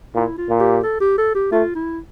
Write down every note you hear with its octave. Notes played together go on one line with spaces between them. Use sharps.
A#2 E4
F4
A#2
G4
A4
G4
A4
G4
A3 F4
E4